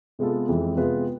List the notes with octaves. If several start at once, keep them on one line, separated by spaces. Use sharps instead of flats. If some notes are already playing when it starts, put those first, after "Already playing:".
C3 G#3 B3 F4 A4
F2 E3 G#3 C4
C3 G#3 B3 F4 B4